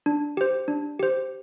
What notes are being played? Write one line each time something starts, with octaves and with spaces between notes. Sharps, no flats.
D4
G4 C5
D4
G4 C5